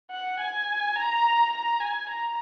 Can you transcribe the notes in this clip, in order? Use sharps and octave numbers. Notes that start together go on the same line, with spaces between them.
F#5
G#5
A#5
A#5
G#5
A#5